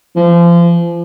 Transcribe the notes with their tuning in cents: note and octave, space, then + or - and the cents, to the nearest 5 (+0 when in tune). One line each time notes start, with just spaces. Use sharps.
F3 -30